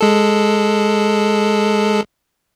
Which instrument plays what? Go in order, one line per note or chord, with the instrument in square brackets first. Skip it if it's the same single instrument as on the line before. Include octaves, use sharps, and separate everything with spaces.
[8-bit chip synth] G#3 A4